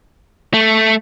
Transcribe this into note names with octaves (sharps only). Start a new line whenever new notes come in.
A3